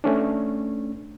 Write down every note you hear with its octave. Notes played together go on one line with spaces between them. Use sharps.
A3 C#4 D4